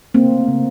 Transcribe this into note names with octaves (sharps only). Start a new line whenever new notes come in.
C#3 A#3 C4
A3
C#3